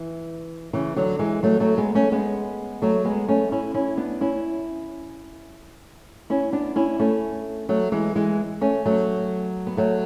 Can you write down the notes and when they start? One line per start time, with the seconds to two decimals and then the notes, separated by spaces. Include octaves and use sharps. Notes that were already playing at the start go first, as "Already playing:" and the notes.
Already playing: E3
0.73 C#3 E3
0.96 D3 F#3
1.19 E3 G#3
1.43 F#3 A3
1.60 F#3 A3
1.78 G#3 B3
1.95 A3 C#4
2.12 G#3 B3
2.82 F#3 A3
3.05 G#3 B3
3.28 A3 C#4
3.52 C#4 E4
3.74 C#4 E4
3.97 B3 D4
4.21 C#4 E4
6.30 C#4 E4
6.52 B3 D4
6.76 C#4 E4
6.99 A3 C#4
7.69 F#3 A3
7.92 E3 G#3
8.15 E3 G#3
8.61 A3 C#4
8.85 F#3 A3
9.67 B3
9.77 F#3 A3